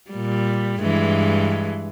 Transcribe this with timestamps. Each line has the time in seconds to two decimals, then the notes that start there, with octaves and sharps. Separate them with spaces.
0.11 A#2 G3
0.81 G2 E3 G#3